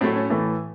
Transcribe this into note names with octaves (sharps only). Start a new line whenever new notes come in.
A2 F#3 A3 C4
C#4
A2 E3 A3